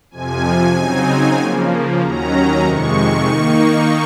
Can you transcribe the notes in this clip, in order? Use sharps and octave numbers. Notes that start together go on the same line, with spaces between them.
F2 C3 F3 G#5
C#3 F#3 C4 D#4
C#3 F3 A#3
D#2 D#3 F#3 C#4 A#5
F2 C3 D#3 G#3 C#6
D#3 A#3 D#4